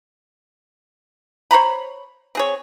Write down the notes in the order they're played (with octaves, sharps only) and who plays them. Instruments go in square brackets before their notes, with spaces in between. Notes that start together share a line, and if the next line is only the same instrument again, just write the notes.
[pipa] C5 C#5 A#5 B5
C4 G#4 C#5